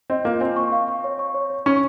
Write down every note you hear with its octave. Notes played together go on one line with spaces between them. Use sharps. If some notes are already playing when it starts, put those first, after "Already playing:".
C4 D#5
A#3 F4
C4 G#5
C#6
F5
C#6
C#5
C#6
C#5
C#5
C#4 C#6